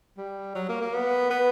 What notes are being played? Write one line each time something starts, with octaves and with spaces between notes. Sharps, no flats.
G3
F#3
A#3
A#3
B3
B3